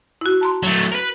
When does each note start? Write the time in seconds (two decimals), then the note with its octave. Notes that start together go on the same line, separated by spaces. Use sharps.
0.21 E4 F#4
0.41 A5 A#5 C6
0.63 F#3 A3
0.92 A#4 B4